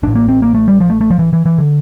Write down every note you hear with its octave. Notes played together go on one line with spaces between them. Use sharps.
A1 A2 D4
A#3
C4
A#3
A3
G3
F3
A3
A3
F3
E3
E3
E3
D3